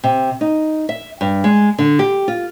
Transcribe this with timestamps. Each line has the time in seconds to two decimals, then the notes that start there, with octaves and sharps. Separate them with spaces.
0.04 C3
0.41 D#4
0.89 E5
1.21 G2
1.44 G#3
1.78 D3
1.99 G4
2.28 F4